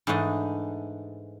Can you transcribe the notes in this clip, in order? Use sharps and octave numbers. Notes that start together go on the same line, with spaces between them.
G#2 E3 A3 D4 D#5